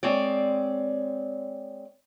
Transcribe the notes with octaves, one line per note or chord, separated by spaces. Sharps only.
G#3 C4 C#5 D5